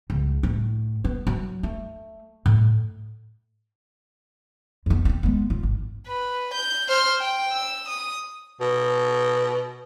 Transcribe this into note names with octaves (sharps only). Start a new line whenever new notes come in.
C#2
A2
B3
F#3
A3
A2
F2 B3
B3 C4
G#3 B3
F4
G#1
B4
G6
C5 F6
G5
E6
D#6
B2